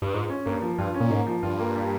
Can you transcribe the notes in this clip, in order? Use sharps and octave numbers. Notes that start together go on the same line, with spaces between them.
G2
G#2 F4
C#4
G2 A#3
F3
G2 F4
C#4
A#2
G#2 A#3
F3
G2 F4
A#3
G3